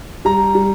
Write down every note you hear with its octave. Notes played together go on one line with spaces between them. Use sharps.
G3 A#5
G3